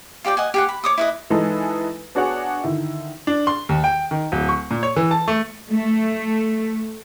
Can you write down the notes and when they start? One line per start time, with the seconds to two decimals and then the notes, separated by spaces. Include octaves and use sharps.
0.24 F4 G4 D5 G5
0.37 D#5 F#5 G#5
0.54 G4 G#4 F#5
0.69 B5
0.84 C#5 D6 D#6
0.98 E4 B4 D#5
1.30 E3 G#3 D#4 A4 B4
2.15 B3 D4 F#4 G#4 C#5 F#5
2.64 D3 D#3 E4
3.27 D4
3.47 C6
3.69 D#2
3.84 G5
4.11 D#3
4.32 D1
4.48 C#6
4.71 A#2
4.83 C#5
4.96 E3
5.11 A5
5.28 A3
5.70 A3